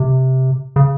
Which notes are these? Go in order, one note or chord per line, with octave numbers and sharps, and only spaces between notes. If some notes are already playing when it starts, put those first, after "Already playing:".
Already playing: C3
C#3